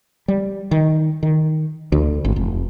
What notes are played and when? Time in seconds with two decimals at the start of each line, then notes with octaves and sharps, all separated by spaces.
0.28 G3
0.71 D#3
1.23 D#3
1.92 D2
2.25 G#1
2.36 F1